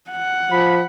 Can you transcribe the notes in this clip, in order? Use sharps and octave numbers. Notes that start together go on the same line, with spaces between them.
F#5
F3 B5